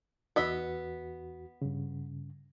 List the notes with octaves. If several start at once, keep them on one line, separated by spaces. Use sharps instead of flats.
E2 B3 F#4 D#5 E5
G2 C#3